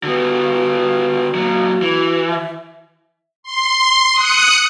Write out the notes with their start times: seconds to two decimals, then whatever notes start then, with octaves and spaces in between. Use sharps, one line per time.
0.03 D3 B3 F#4
1.35 A#2 F#3
1.82 E3
2.29 E5
3.43 C6
4.12 D#6 F#6 C#7